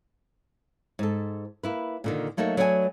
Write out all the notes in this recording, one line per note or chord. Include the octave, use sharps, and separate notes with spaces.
G#2 A4
A#3 E4 B4
A#2 D3 D#3
F#3 A3 A#3 D#4 F#4
F#3 A3 B3 D4 E5 G#5